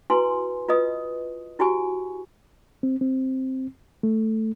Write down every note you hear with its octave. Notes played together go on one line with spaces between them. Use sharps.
E4 F#4 B4 G#5 C6
F4 B4 D#5 D#6
E4 F#4 G4 G#5 C#6
C4
C4
A3